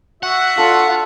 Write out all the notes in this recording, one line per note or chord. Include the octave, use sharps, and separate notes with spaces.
F#4 E5 F#5
D4 F4 A4